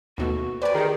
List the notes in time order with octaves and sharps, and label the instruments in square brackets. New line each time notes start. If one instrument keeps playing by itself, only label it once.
[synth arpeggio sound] D#2 B2 A3 [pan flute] F#4
[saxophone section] G4 C5 D5 [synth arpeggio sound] B4 G#5
[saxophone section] D#3 [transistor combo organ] G4 A#4 [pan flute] G#4